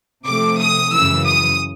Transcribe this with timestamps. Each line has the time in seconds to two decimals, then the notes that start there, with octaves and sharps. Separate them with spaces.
0.25 C3 F3 A3 D6
0.58 D#6
0.91 F#2 C#3 E3 E6
1.25 D#6